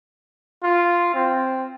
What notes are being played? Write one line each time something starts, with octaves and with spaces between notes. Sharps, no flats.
F4
C4